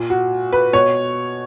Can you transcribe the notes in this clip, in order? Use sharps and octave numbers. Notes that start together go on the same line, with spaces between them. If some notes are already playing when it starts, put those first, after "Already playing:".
Already playing: A#2
F#4
B4
B2 C#5